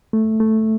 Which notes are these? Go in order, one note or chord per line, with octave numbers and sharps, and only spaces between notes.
A3
A3